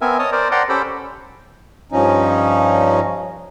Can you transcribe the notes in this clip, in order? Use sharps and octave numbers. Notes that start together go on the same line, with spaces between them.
B3 C4 A#4 E5 G#5
C#5 D#5 A5 D#6
A#4 C5 D5
D5 F#5 G5 A5 A#5 C6
C#4 G4 A4 C5 G5 B5
G2 F3 C#4 D#4